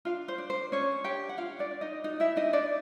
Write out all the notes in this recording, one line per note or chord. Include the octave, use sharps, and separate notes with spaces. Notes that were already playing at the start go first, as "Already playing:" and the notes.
D4 F4 F5
C5
D4
C5
C#4 D4 C#5
D4 G4 G5
F#5
D4 F4 F5
D4 D5
D4
D#4 D#5
D#4 F#4 D#5
E4 E5
D4 D#4 D#5
D4 D5